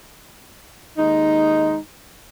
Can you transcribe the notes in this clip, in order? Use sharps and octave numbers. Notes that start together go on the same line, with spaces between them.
D#2 G#3 D#4